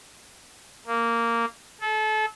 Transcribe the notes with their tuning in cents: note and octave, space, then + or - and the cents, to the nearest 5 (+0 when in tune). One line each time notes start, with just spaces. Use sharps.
A#3 -10
A4 -30